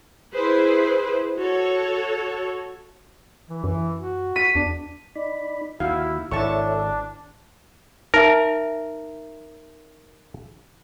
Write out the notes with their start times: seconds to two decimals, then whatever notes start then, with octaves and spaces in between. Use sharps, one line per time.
0.34 E4 G#4 B4 C5
1.37 F#4 A4 C#5
3.49 E3
3.64 F#2 E3
3.97 F#4
4.36 B6 D#7
4.55 E2 D4
5.15 D#4 D5 B5
5.80 D#2 D#3 E4 F#4 F5
6.31 G#1 D4 E4 A4 C#5 E5 A5 C#6
8.14 D#4 A#4 E5